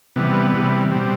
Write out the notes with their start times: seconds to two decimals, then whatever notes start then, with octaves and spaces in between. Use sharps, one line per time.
0.16 C3 E3 G3 B3
0.54 C3 E3 G3
0.91 B2 G3 C4